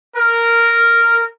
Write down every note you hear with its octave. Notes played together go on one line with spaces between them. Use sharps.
A#4